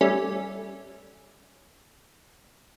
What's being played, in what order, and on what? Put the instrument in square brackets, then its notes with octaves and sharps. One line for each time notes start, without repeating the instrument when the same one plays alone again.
[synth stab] G3 A3 C#4